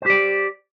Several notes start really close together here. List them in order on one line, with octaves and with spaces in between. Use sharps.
C5 G4 D5